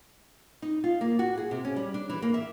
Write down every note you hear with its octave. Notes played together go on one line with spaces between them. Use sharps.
D#4
F4
A#3
F#4
G#4
C3
C#4
G3
D4
E3
A#3
E5